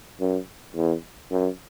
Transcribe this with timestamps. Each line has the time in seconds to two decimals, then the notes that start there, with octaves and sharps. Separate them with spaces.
0.20 F#2
0.76 E2
1.31 F#2